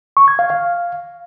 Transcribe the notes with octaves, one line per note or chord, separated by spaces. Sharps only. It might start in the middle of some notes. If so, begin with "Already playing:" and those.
C#6
G#6
F5
F5